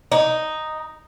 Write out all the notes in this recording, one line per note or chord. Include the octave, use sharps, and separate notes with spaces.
D#4